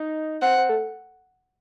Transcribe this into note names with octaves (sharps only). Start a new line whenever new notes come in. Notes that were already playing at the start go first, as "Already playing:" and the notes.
Already playing: D#4
C4 F#5
C4
A3